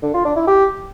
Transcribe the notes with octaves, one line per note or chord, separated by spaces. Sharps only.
D3
F4
D4
E4
G4